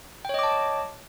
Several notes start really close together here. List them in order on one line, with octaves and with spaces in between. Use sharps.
G5 C#5 D#5 D6 A5